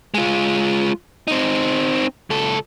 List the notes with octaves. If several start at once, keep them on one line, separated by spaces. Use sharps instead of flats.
G#3 F4
C4 D#4
C#2 A4